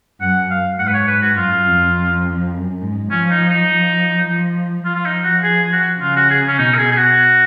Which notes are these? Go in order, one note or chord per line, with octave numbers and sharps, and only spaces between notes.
F#2 F#5
F5
G#2 F#5
B4
C#5
B4
F#4
F#2 F4
F2
F#2
G#2
F3 C#4
D#4
D#4
F3
F3
F3 F4
F4
D#4
F#4
G#4
F#4
C#3 F4
F#4
G#4
C#4
B2 D#4
A#4
G#4
G#4
F#4